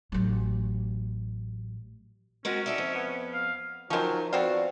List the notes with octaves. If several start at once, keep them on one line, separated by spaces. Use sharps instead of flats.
A1 F#3
G#3 C4 C#4 F#4 A#4
D#4 A4 D5 E5
F2
B3
F5
D#3 F3 F#3 C#4 C5
B3 C4 F4 F#4 D5